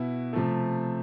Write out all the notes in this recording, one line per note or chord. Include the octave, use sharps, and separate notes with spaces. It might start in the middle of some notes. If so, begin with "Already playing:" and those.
Already playing: B2 B3 E4
C3 F3 A3